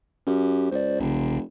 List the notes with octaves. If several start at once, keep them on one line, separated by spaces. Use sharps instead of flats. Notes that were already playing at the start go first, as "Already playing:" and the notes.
F#2 C#4 G4
C#2 C5 D5
F1 B1 C#3